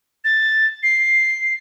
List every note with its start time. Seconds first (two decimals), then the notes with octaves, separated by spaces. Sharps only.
0.24 A6
0.83 C7